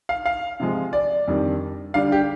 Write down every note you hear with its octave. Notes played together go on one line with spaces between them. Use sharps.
F5
F5
C3 F3 G#3
D5
F2 D#3 G3 D4
D3 G3 D4 F5
G4